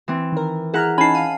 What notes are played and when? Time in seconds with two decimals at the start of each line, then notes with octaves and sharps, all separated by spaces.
0.08 E3 C4
0.32 D#3 A#4
0.74 E4 G#4 F#5 A#5 F6 F#6
0.98 C#4 D#4 G#5 A5 B5 C7
1.15 F5 D#7